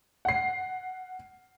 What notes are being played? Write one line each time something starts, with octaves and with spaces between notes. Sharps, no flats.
F#5 C7